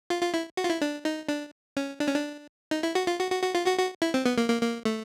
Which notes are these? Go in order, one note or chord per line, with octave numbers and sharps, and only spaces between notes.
F4
F4
E4
F#4
F4
E4
D4
D#4
D4
C#4
D4
C#4
D4
D#4
E4
F#4
F4
F#4
F#4
F#4
F4
F#4
F#4
E4
C4
B3
A#3
A#3
A#3
A3